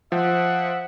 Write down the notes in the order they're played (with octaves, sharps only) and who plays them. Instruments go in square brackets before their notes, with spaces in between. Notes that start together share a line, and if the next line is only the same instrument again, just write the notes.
[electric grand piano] F3 [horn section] C5 E5 F#5